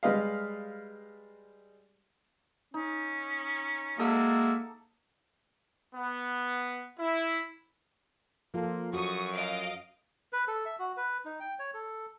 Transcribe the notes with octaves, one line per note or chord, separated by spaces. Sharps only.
G3 G#3 B4 D#5 F5
C#4 D#4
G#3 A#3 F#4 A4 E5
B3
E4
F3 A#3 F4 A4
F#2 F#4 C#6 D#6
D#5 F5 D7
B4
A4
E5
F#4
B4
D#4
G5
C#5
A4